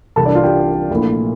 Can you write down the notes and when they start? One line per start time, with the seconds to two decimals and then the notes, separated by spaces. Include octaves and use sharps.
0.16 C2 C3 E3 A#3 A4 A5
0.26 D4 D5
0.35 F4 F5
0.44 G4 G5
0.90 A#1 A#2 A3 E4